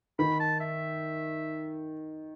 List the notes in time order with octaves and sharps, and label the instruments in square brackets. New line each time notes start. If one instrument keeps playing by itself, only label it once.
[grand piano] D#3 [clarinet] B5
[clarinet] A5
E5